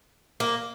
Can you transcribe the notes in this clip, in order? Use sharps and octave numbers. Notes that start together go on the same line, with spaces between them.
A#3